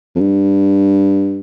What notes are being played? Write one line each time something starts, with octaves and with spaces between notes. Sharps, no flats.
F2
G2